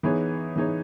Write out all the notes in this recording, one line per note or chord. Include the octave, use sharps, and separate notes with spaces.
E3 B3 D#4 G#4 C#5
E3 B3 D#4 G#4 C#5